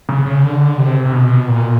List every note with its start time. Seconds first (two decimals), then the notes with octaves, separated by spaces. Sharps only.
0.09 C#3
0.26 C#3
0.43 D3
0.78 C3
1.05 C3
1.13 B2
1.48 A#2